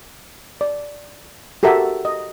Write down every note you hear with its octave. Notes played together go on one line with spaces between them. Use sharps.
D5
F#4 G4 A4 A#4 E5
D#5